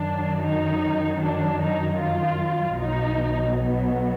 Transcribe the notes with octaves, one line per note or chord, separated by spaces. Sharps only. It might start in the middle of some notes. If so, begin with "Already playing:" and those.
Already playing: F#2 D#3 F#3 D4
D#4
D4
D#4
F4
B1 B2 F#3 D#4
B3